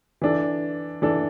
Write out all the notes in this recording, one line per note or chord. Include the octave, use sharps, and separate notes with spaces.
E3 D4 A4
E3 D4 A4